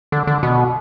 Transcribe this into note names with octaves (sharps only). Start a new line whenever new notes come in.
D3
D3
B2